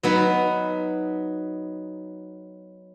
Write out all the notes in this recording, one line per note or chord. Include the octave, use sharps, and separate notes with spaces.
F#3 B3 D#4